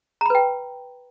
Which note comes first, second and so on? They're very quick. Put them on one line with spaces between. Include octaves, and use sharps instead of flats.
A#5 B5 B4 G5